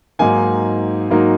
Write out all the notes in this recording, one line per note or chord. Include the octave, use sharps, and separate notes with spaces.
G#2 F#3 A#3 D#4 G#5
G#2 F#3 A#3 D#4